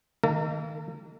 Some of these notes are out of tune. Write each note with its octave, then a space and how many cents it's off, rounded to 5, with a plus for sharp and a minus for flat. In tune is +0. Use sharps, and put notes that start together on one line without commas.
D#3 +0 A#3 -30 A4 +45